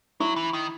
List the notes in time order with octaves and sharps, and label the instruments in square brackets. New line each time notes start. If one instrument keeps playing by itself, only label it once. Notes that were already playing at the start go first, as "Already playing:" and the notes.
[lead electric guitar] F#3 [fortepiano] E4
[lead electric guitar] E3
D#3